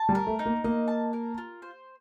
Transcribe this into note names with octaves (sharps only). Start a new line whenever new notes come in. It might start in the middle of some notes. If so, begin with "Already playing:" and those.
Already playing: A5
G3
A#4
A3
D#4
A#3
A#3 D#5
A5
A#4
F4
C5